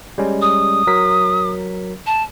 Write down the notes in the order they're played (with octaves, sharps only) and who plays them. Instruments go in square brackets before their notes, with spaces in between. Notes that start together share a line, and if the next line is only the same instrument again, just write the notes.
[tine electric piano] G3 G#3 C#4
[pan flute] D#6
[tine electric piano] F#3 A#4 B6
[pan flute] A5